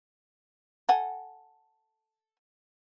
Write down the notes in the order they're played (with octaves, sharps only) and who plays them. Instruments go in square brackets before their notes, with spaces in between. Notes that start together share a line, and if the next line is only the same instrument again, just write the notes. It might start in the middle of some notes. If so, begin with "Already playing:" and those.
[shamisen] A4 F#5 G#5